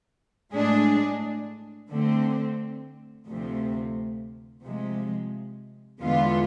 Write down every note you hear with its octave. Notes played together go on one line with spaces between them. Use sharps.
A2 G#3 D4 G#4
D3 A3 C4
D2 C3 F3 A3 C4
C3 F3 G#3
E2 D3 G#3 B3 F4